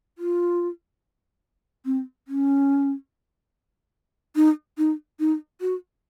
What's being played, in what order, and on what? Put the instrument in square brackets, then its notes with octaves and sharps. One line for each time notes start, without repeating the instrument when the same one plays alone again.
[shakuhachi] F4
C4
C#4
D#4
D#4
D#4
F#4